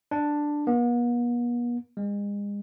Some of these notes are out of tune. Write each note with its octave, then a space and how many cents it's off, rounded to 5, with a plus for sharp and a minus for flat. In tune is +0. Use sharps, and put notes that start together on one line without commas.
D4 +5
B3 -45
G#3 -35